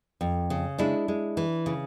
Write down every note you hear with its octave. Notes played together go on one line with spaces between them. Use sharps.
F2
C#3
G#3 D4 E4
G#3
E3
C#3